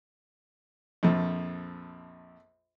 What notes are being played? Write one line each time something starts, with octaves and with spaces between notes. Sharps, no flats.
A#1 F2